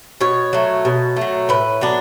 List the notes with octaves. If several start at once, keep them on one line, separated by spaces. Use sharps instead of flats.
B2 C#5
F#3 A3
B2
F#3 A3
A2 B4
F#3 B3 D4